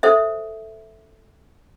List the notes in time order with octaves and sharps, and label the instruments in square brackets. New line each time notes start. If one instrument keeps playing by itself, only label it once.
[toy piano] A4 C5 E5